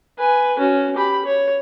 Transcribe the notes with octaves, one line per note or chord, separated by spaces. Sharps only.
B4 G#5
C#4 F#4
G4 B5
C#5